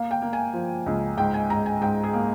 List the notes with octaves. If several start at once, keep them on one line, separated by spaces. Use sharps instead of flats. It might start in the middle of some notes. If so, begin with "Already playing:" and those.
Already playing: A#3 F5
G5
A#3
G#5
F3
C#2
G#2 G5
G#5
G#2 A#5
G#5
G#2 G5
G#4
A#3